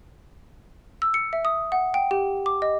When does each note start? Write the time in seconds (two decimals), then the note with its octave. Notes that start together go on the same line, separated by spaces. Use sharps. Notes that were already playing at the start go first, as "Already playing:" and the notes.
1.02 E6
1.14 C#7
1.33 E5
1.45 D#6
1.72 F#5
1.94 G5
2.11 G4
2.46 D6
2.62 D#5